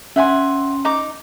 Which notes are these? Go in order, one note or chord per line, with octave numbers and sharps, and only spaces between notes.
C#4 E5 F#5 G#5 C6
D#4 A#5 D6